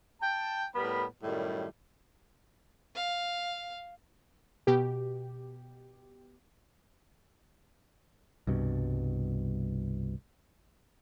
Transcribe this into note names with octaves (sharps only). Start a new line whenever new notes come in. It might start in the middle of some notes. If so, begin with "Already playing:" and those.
G5 A5
A2 G3 B3 A#4 B5
F#2 A2 D#3 G3
F5
B2 G4
C2 G2 B2